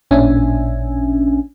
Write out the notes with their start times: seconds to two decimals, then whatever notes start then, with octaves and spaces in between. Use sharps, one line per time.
0.11 A1 A#2 C#4 D4 E5 G#5